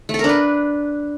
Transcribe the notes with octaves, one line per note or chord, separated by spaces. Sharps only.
A3
A4
A#4
D4
B4